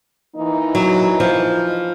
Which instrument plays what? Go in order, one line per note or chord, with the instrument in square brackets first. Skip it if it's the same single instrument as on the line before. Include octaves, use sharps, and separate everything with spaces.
[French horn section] E3 A#3 D#4
[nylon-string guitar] F#3
F3